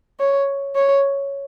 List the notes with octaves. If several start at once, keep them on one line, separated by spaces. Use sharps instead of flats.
C#5
C#5